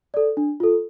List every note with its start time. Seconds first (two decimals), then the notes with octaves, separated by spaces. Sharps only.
0.14 A4 D5
0.37 D4
0.60 F4 A4